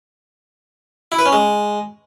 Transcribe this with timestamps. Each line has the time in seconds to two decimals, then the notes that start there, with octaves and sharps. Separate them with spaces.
1.12 E4
1.19 B4
1.26 C#4
1.32 G#3